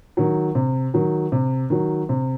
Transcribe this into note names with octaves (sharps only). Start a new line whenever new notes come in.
D#3 F#3
C3
D#3 F#3
C3
D#3 F#3
C3